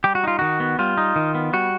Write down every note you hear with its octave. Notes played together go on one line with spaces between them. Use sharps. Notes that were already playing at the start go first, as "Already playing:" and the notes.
G3 G4
F#4
D#4 F4
D#3 F#4
B3
G3 F4
D#4
D#3
B3
G3 F#4